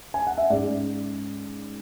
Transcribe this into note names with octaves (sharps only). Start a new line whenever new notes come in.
G#5
F#5
E5
G#2 G#3 C#4 D5